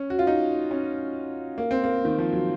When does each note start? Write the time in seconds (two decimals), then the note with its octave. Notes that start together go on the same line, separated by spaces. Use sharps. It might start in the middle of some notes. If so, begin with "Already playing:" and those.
Already playing: C#4
0.10 F#4
0.19 F4
0.27 D#4
0.71 C#4
1.58 A#3
1.71 C4
1.84 A#3
2.05 D#3
2.18 F3
2.32 F#3